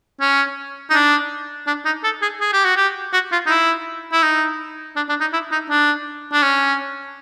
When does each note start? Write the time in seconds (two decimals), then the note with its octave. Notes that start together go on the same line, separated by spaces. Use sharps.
0.21 C#4
0.90 D#4
0.94 D4
1.67 D4
1.85 D#4
2.04 A4
2.22 G#4
2.41 G#4
2.53 G4
2.65 F#4
2.76 G4
3.13 F#4
3.32 F4
3.46 D#4
3.49 E4
4.13 E4
4.23 D#4
4.96 D4
5.09 D4
5.20 D#4
5.33 E4
5.52 D#4
5.70 D4
6.32 D4
6.43 C#4